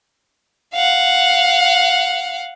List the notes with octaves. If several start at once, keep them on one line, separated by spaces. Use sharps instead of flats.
F5 F#5